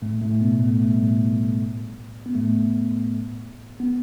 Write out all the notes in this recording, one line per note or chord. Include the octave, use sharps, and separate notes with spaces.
A2 A3
A2 A3
B2 B3
A2 A3
A3
G3
A2 A3
B3
A2 A3
B3